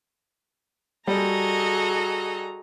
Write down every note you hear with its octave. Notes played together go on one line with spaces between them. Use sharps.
G3 F#4 G#4 A4 D#5 A#5